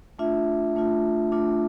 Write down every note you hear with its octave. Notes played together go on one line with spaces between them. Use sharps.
A3 D4 F4 E5
A3 D4 F4
A3 D4 F4